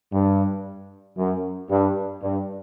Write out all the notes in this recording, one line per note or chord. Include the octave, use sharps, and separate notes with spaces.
G2
F#2
G2
G2